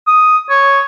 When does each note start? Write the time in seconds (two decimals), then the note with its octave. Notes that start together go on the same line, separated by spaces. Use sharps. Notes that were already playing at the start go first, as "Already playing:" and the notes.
0.07 D#6
0.50 C#5